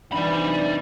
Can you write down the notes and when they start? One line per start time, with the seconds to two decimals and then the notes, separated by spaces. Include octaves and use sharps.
0.13 C3 E3 D4 D#4 D5 B5